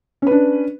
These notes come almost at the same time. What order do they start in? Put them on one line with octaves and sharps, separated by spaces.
C#4 B4 D4